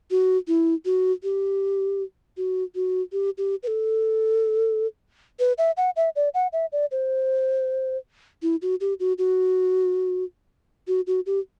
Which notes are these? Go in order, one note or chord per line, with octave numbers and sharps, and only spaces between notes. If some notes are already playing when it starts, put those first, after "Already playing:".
F#4
E4
F#4
G4
F#4
F#4
G4
G4
B4
A4
B4
E5
F#5
E5
D5
F#5
E5
D5
C5
E4
F#4
G4
F#4
F#4
F#4
F#4
G4